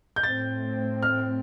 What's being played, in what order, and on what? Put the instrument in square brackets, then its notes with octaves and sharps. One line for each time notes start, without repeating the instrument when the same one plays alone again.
[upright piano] G6
[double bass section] A2 A3 C4 [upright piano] A6
[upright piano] F6